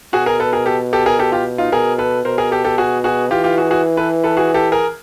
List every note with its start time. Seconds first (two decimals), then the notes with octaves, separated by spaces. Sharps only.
0.13 B2 F#4 G#4
0.26 G#4 A#4
0.40 A4 B4
0.53 G#4 A#4
0.66 G4 A4
0.93 G4 A4
1.06 G#4 A#4
1.19 G4 A4
1.32 F4 G4
1.58 D#4 F4
1.72 B2 G#4 A#4
1.98 A4 B4
2.25 B2 A#4 C5
2.38 G#4 A#4
2.51 G4 A4
2.64 G4 A4
2.78 F#4 G#4
3.04 F#4 G#4
3.31 E3 F4 G4
3.44 F4 G4
3.58 F#4 G#4
3.71 F#4 G#4
3.97 A4 B4
4.24 A4 B4
4.37 F#4 G#4
4.54 G4 A4
4.72 G#4 A#4